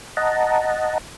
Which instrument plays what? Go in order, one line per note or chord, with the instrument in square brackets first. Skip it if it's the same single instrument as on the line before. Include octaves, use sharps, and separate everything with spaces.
[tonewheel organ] D#5 F#5 A5 A#5